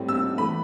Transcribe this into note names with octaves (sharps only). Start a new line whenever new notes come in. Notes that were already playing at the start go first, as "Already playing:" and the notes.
Already playing: A2 G3 C4
E6
E3 A3 B5